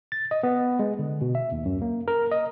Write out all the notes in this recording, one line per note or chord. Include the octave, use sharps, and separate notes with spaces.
A6
D#5
B3
G#3
D3
B2
E5
D#2
F#2
A#3
A#4
D#5